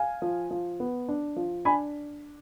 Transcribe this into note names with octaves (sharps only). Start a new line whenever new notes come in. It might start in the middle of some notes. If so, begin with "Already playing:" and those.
Already playing: F5 G#5
F3
F3
B3
D4
F3
D4 G#5 B5